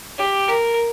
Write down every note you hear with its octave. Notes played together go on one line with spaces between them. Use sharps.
G4
A#4